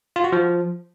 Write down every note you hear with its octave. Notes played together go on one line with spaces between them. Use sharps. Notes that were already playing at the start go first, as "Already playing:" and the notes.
F4
F#4
F3